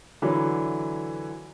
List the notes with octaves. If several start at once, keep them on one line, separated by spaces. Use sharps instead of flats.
D3 E3 F#3